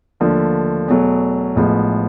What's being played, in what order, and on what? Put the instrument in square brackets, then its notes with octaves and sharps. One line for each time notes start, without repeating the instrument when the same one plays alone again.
[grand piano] D#2 D3 F3 A3
E2 B2 F#3 A3
A1 A2 F3 G#3 B3